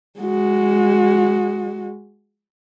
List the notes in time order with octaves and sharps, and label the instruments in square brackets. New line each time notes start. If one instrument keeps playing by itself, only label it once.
[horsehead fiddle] G#3 F#4